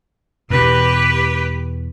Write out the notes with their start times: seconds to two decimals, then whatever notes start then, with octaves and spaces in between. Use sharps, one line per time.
0.50 E2 B2 G4 B4